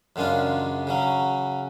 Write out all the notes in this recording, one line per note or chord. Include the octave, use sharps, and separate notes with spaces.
F#2 C#3 G#3 D4 F4
C#3 F#3 C#4